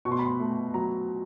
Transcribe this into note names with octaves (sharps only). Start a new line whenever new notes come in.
B2 C#6
C6
B5
C6
A3
F#3 A#5